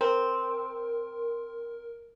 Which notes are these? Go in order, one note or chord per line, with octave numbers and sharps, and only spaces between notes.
C4 A#4